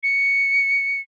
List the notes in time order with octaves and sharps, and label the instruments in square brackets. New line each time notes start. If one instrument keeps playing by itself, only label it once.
[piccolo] C#7